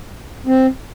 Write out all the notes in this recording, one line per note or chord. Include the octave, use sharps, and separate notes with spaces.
C4